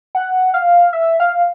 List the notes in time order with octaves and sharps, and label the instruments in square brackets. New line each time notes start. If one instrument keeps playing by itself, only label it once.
[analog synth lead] F#5
F5
E5
F5